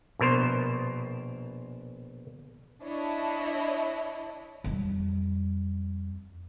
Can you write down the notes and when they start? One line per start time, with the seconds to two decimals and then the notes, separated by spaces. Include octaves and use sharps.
0.19 A#1 B2 A#4 C5
2.84 D4 E4 C#5 D#5
4.64 F2 G3